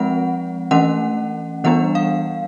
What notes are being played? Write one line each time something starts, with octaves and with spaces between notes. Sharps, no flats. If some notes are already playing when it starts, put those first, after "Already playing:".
Already playing: F3 G#3 C4 F#5
E3 A3 C#4 F#5
E3 G3 B3 D4 F#5
F5